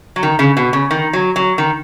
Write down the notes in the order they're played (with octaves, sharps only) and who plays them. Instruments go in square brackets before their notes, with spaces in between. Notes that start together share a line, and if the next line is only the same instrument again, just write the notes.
[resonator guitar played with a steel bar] F#3
D#3
C#3
B2
C#3
D#3
F#3
F#3
D#3